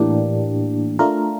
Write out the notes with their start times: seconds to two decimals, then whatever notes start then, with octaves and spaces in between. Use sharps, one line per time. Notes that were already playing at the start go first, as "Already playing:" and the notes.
Already playing: A2 E3 A#3 D4 G4
0.99 A3 D4 F4 A#4